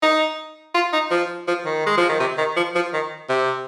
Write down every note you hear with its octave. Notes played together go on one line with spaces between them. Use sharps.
D#4
F4
D#4
F3
F3
D#3
G#3
F3
D#3
C3
D#3
F3
F3
D#3
C3